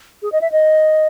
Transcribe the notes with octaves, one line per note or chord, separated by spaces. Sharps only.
G#4
D#5
E5
D#5